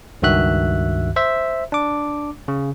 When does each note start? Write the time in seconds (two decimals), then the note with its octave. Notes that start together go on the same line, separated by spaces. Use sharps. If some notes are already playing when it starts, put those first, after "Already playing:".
0.22 C#2 G2 D#3 F#4 E5 F#6
1.16 C5 E5
1.72 D4 D6
2.48 C#3